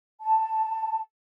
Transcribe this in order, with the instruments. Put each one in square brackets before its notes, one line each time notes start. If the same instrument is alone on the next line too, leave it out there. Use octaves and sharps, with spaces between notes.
[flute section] A5